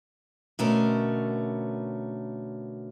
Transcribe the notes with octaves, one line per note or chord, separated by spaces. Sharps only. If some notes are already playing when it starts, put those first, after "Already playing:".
B2 D3 A3 C#4 A#4